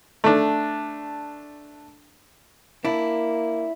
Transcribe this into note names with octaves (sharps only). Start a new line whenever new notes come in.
A3 D4
A#3 D4 E4